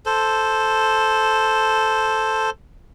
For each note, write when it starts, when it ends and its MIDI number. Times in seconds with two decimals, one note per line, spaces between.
0.06 2.50 69
0.06 2.50 72